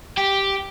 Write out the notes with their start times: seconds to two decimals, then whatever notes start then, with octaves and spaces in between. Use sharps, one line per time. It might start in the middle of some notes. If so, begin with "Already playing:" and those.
0.17 G4